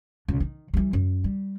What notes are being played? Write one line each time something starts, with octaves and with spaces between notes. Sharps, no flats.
C#2 B2
D#3
E3 G3
F#2
G3